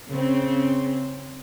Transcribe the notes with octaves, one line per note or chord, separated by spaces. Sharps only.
C#3 C4